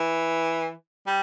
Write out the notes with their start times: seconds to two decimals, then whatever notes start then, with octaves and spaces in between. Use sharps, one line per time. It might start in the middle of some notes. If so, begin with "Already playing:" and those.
Already playing: E3
1.06 G3